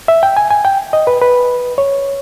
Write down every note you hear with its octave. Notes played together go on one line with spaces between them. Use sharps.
E5
G5
G#5
G#5
G5
D#5
B4
B4
C#5